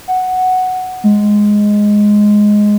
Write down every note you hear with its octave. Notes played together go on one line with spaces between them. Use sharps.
F#5
G#3